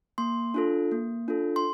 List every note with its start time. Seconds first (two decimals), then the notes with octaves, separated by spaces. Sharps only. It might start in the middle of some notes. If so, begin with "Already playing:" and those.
0.18 A#3 C6
0.54 D4 F4 A4
0.92 A#3
1.28 D4 F4 A4
1.56 C6